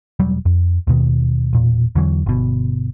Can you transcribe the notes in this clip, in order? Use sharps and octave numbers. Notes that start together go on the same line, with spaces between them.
E1 F#3 G3
F2
D#2 B2 D#3
E1 A#2
E2 D3 E3 F#3
G1 B2